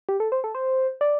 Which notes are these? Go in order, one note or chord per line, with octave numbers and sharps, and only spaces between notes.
G4
A4
C5
A4
C5
D5